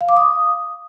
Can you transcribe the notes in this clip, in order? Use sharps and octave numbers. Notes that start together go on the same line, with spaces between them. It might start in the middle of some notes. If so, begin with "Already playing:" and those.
F5
D6
D#6